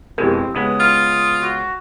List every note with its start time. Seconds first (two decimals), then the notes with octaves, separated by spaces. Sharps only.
0.18 F2 B2 G#3 C4 E4 G4 A#4
0.55 C#2 G#3 B3 D#6
0.80 F4 F6
1.41 F#4